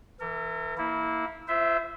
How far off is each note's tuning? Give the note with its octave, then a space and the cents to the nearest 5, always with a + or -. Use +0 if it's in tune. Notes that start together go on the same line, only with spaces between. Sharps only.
E3 +5 A#4 -40
A#3 -5 E4 -20
F4 -45 C5 -15 E5 +0